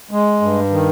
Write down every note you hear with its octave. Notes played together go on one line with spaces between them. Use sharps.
G#3
G2
D#3